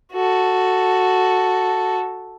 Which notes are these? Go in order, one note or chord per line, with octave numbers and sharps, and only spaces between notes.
F#4 A4